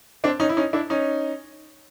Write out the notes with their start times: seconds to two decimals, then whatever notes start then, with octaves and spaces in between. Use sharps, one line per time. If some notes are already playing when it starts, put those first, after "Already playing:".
0.24 C4 D4
0.40 C#4 D#4
0.49 E4
0.57 C#4 D#4
0.73 D4 E4
0.90 C#4 D#4